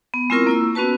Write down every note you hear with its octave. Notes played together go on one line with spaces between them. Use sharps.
B3
G#3 C4 E4 F4 A#4 C#6
A#3 E4 E6
B3 C#4 F#4 B4 A5